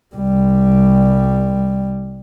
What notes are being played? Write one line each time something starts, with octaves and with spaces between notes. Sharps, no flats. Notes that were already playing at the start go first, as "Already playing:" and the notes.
C2 G3